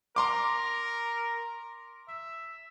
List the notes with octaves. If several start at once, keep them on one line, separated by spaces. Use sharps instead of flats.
A#4 A#5 C6 D6
E5